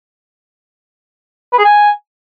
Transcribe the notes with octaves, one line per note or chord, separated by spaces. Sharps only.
B4
G#4
G#5